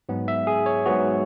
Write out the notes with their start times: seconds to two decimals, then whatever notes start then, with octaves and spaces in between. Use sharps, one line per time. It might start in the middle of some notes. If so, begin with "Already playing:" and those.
0.09 G#2 F#3 B3
0.28 E5
0.47 G#4
0.66 C#5
0.86 G#2 F#3 B3 F#4